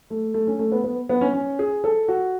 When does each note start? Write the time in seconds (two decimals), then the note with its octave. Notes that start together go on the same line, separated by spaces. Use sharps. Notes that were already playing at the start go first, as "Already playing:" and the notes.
0.10 A3
0.34 A3
0.47 C#4
0.59 A3
0.72 B3
0.84 B3
1.09 B3
1.21 C#4
1.33 C#4
1.59 G#4
1.84 A4
2.08 F#4